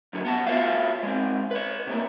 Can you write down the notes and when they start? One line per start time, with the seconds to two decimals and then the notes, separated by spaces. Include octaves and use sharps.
0.13 F#2 D3 F#3
0.25 B3 F#5 A5
0.47 F4 F#4 G#4 C#5 E5 F5
1.03 G#3 C4
1.51 B4 C#5
1.87 C3 A3 A#3